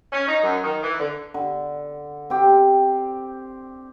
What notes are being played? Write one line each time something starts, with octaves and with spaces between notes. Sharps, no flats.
C#4
D#4
F#2
D#3
E3
D3
D3
C4 G4